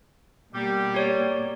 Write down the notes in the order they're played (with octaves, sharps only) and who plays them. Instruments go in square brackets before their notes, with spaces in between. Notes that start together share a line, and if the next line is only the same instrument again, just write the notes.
[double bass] B2 A#3 [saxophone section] G3
[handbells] G4 C#5 D5